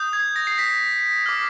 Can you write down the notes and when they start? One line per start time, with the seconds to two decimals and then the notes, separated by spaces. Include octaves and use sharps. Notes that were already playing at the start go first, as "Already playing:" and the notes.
Already playing: D#6 G6
0.13 G#6
0.36 A#6
0.47 C7
0.58 B6
1.26 D6 F6